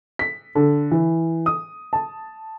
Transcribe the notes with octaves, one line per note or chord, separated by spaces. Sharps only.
B6
D3
E3
D#6
A5